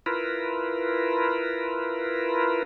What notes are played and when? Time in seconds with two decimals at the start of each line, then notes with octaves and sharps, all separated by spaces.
0.06 E4 F4 A#4 B4